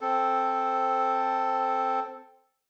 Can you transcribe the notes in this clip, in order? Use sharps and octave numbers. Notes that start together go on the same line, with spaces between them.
C4 A4